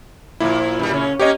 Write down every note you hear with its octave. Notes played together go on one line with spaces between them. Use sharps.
A#2 F3 A#3 E4
F#2 G3
C#3 C#4
A#3 C#4 G4 C#5 D#5